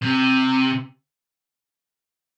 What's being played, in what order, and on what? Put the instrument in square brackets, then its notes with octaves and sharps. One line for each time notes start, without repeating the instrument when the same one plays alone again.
[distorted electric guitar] C3